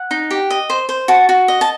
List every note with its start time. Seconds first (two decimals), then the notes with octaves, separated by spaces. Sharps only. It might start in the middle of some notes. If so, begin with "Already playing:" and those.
Already playing: F#5
0.11 D#4
0.31 G4
0.50 D#5
0.70 C5
0.89 C5
1.08 F#4 A5
1.29 F#4
1.48 D#5
1.61 A5